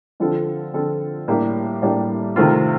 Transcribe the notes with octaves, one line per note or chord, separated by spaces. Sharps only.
D3 F3 C4 F4 A4
D3 F3 C4 F4 A4
A2 G3 A#3 D4 G4
A2 G3 A#3 D4 G4
C3 D#3 A3 C4 F4